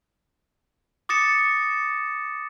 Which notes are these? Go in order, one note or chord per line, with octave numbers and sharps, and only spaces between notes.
D6 D#6 A6 A#6 C#7 E7